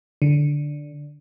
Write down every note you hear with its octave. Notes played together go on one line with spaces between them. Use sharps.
D3